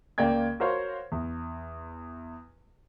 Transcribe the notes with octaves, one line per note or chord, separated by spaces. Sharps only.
C#2 A#3 D5 G5 G#6
F#4 A#4 C5 C#5 F5
E2